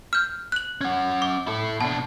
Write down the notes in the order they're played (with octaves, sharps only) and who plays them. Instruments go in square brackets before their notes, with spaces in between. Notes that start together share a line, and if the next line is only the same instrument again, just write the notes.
[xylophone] F6 G6
F#6 F#7
[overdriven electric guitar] C#4 F#5
[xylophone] D6
[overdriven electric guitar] E4 A4
[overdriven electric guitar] B2 D4 [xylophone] A5